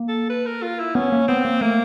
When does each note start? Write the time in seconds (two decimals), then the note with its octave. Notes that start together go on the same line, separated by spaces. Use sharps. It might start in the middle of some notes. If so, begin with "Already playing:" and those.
Already playing: A#3
0.08 A4
0.29 B4
0.46 A#4
0.62 F4
0.80 E4
0.95 B3 C#4
1.12 A#3
1.28 B3 C4
1.45 A#3
1.61 A3 A#3